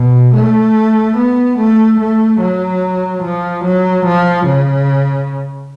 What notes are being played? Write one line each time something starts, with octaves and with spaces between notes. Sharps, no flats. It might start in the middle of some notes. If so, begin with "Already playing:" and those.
Already playing: B2
A3
B3
A3
A3
F#3
F3
F#3
F3
C#3